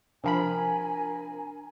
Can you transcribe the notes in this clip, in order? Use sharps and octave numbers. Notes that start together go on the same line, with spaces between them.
C3 F3 D4 A#4 G#5 B5